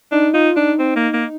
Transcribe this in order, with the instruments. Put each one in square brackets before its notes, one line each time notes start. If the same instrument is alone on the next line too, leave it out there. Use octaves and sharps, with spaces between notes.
[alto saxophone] D4 [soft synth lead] D#4
[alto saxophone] D#4 [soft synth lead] F4
[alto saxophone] D4 [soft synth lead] D#4
[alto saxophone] C4
A#3
A#3